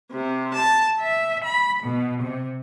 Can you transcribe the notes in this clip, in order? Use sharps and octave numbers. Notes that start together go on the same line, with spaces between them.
C3
A5
E5
B5
B2
C3